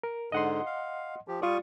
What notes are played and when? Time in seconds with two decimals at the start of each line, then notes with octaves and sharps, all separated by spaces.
0.03 A#4
0.32 G#2 D3 D#5 F#5 C6
0.66 F5
1.28 F3 G4
1.42 G3 F4 D5 C#6 D#6